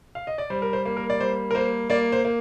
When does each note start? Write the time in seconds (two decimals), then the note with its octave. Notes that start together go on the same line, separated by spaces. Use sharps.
0.15 F5
0.27 D#5
0.38 D5
0.50 G3 C5
0.62 A#4
0.73 C5
0.85 A#3
0.97 A#4
1.10 D5
1.20 G3 C5
1.51 A#4
1.55 A#3 C5
1.90 A#3 D5
2.12 C5
2.25 A#3